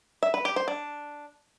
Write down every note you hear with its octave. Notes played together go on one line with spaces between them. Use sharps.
E5
B4
G4
C5
D4